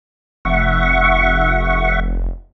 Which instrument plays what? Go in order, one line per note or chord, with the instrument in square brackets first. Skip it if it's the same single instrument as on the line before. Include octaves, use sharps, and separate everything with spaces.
[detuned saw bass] F1 [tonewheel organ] E5 F#5 C#6